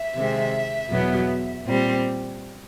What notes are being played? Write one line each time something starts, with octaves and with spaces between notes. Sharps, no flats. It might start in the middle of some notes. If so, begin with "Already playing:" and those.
Already playing: E5
C3 D#3 G#3 C4
E2 B2 F#3 B3
A#2 G3 C4